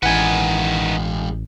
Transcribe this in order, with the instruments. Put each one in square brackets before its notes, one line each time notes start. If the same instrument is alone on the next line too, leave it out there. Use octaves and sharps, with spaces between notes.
[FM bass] A1 [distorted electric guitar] D#3 B4 [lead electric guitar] E3 G#3 [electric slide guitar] F#5 G#5